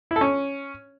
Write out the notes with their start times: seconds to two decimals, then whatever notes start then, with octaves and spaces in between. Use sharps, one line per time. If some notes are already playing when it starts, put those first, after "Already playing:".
0.11 E4
0.16 A4
0.21 C#4